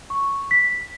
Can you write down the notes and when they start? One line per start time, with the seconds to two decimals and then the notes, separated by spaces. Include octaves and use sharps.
0.10 C#6
0.51 B6